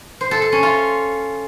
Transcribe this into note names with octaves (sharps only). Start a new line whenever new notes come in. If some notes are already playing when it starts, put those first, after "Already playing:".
C5
A4
A4
C#4
F4